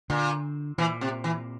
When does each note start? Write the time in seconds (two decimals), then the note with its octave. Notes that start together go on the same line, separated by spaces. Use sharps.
0.10 A#2 D3
0.78 A#2 E3
1.01 C3
1.24 E3